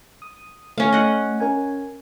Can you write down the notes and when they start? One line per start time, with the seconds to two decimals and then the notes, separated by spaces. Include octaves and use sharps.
0.22 D#6
0.78 A3 C#4 F5
0.93 D#5 F#5
1.40 C#4 A#4 G#5